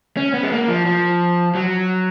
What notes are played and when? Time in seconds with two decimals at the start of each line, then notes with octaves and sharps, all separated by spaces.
0.17 C#4
0.34 B3
0.43 G#3
0.52 A#3
0.68 F3
0.86 F3
1.55 F#3